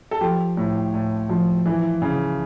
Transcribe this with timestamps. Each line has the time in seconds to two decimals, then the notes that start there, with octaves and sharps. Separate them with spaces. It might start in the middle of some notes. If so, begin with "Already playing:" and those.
0.11 A4
0.21 F3 G4
0.57 A2
0.94 A2
1.29 F3
1.66 E3
2.02 C#3